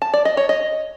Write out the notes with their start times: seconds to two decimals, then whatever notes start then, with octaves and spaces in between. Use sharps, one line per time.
0.02 A5
0.13 D5
0.25 D#5
0.37 C#5
0.49 D#5